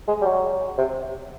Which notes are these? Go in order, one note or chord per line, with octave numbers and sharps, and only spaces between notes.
G#3
G3
F#3
C3